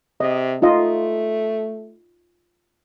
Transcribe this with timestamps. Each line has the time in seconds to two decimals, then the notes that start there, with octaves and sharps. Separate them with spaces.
0.20 C3 D#5
0.62 A3 D#4 F4 D#5